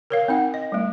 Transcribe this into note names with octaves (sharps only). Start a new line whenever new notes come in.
A#4 C#5 F5
C4 D#4 F#5
D#5
G3 A3